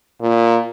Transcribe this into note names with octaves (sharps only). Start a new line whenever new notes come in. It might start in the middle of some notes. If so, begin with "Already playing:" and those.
A#2